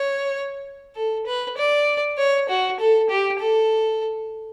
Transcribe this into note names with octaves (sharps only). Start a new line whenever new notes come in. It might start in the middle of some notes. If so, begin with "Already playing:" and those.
Already playing: C#5
A4
B4
D5
C#5
F#4
A4
G4
A4